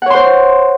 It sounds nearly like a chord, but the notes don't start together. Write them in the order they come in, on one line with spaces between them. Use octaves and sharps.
F#5 C#5 C6 C5